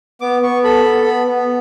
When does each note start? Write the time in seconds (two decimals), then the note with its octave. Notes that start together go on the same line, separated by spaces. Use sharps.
0.21 B3 D6
0.43 B3 C#6
0.64 A4 B5
0.85 B3
1.06 B3
1.27 B3